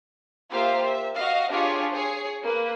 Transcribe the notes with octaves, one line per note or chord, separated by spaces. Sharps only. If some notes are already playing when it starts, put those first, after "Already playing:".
A#3 F4 G4 C5 E5 F5
E5
F#4 D#5 F5
D4 F4 G4 G#4 C#5
G#4 C#5 C7
A#3 B4